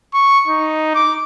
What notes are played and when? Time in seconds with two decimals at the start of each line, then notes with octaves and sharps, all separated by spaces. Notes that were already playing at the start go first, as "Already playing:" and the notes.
0.13 C#6
0.47 D#4
0.95 D6